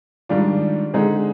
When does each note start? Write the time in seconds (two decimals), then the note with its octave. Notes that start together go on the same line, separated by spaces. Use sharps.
0.29 G#2 D#3 G3 D4 F4
0.94 D3 G#3 C4 D#4 G#4